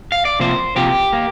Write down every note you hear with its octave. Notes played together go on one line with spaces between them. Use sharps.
F5
D5
C3 F3 A#3 C5
C3 F3 A#3 G4
A#3